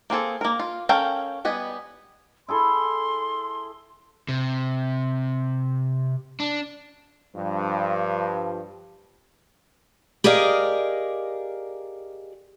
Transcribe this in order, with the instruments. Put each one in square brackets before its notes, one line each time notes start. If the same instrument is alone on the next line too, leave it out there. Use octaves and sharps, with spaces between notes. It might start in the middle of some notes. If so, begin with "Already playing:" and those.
[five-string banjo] A#3 C4 G#4 A4
A#3 A#4
F4
C#4 A4 A#4 F5 G5
G3 B3 D#5 G#5
[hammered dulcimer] E4 G#4 A4 [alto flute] C6
[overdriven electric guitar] C3
D4
[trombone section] G2 F3
[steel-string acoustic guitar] G4 G#4 A#4 D5 D#5 F5